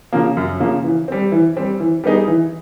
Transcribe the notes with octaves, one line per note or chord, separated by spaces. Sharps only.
C#3 F3 A#3
F#2
C#3 F3 A#3
E3
G3 C4
E3
G3 C4
E3
G3 B3 D#4 G#4
E3